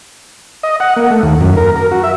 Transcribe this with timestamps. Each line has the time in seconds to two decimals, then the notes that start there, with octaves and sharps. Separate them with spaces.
0.63 D#5
0.80 F#5
0.96 A#3
1.10 A3
1.23 D#2
1.41 F#2
1.57 A#4
1.76 A#4
1.91 F#4
2.04 E5